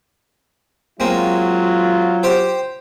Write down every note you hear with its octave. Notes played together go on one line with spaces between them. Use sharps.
F#3 G#3 A#3 C4 F4
G4 C5 G5